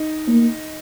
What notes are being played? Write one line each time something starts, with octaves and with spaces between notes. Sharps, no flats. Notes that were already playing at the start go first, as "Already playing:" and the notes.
Already playing: D#4
A#3